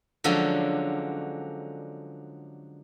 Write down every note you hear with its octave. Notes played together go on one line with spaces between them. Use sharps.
D3 F3 F#3 G#3 C#4 D4